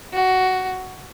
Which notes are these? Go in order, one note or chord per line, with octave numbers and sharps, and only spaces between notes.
F#4